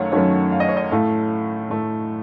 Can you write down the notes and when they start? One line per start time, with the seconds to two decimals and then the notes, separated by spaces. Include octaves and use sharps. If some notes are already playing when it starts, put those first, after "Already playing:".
Already playing: F#2 D#3 F#3 A3 C#5 F5 F#5
0.12 F#2 D#3 F#3 A3 C#5
0.52 F5
0.60 D#5
0.69 C#5
0.77 D#5
0.91 A2 A3 F5
1.70 A2 A3